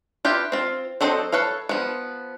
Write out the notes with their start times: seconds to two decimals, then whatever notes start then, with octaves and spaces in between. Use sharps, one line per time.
0.25 F4 G4 B4 E5
0.52 C4 F4
1.01 F#3 C4 A4 C5 D#5
1.32 A4 B4 C#5 F5
1.69 F3 B3